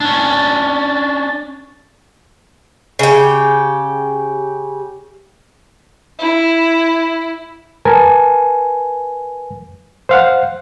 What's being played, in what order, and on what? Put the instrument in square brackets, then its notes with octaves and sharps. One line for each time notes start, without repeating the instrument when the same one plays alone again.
[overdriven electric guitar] C#4 D4
[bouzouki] C#3 G4
[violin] E4
[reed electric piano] A#4 B4 G#5 A5
C5 F5 F#5